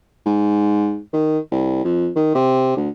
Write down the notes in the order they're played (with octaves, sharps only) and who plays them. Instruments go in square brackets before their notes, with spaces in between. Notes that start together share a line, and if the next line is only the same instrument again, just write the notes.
[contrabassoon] G#2
D#3
C2
F2
D#3
C3
D2